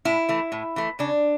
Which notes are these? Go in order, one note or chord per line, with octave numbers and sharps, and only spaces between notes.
A2 E4
E3 A3
A2
E3 A3
C#3 D4